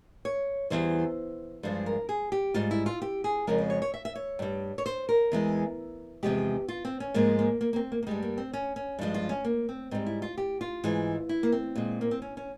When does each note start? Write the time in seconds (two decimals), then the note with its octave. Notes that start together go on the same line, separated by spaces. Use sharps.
0.25 C#5
0.70 E2 E3 G3 C5
1.63 G2 F3 G#3 C5
1.86 A#4
2.09 G#4
2.32 G4
2.54 G#2 G3 F4
2.71 E4
2.86 F4
3.02 G4
3.24 G#4
3.47 F2 C#3 F3 G#3 A#4
3.58 C5
3.70 C#5
3.82 C#5
3.94 E5
4.05 E5
4.15 C#5
4.39 G2 G3
4.78 C#5
4.86 C5
5.09 A#4
5.32 E2 E3 G#3
6.23 E2 C3 F3 G#3 G4
6.68 F4
6.85 C4
7.00 C#4
7.14 G#2 F3 G#3 A#3
7.39 A#3
7.61 A#3
7.73 A#3
7.76 C4
7.92 A#3
8.03 A#3
8.07 G2 G3 G#3
8.22 A#3
8.38 C4
8.53 C#4
8.76 C#4
8.99 G2 F3 G#3
9.14 F4
9.29 C#4
9.44 A#3
9.69 C4
9.91 G#2 G3 C4
10.06 E4
10.22 F4
10.37 G4
10.61 F4
10.84 G#2 E3 G#3
11.29 E4
11.43 A#3
11.52 C4
11.75 A#2 G#3
12.01 A#3
12.11 C4
12.22 C#4
12.37 C#4